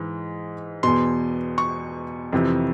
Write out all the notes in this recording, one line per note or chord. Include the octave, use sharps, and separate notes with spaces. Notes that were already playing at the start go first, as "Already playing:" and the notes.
Already playing: G#2 E3
E2 B2 C6
C#6
F2 C3 E3